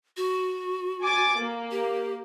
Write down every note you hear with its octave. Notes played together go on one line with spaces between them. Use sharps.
F#4
G#5 D6 A6
A#3
G4